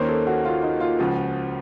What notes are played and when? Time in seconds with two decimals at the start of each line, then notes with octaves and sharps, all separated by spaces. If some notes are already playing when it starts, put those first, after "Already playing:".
Already playing: D#2 D#3 A#3 C#4 C5
0.08 A4
0.27 F#4
0.45 F4
0.63 D#4
0.80 F4
0.99 C#2 C#3 F3 F#4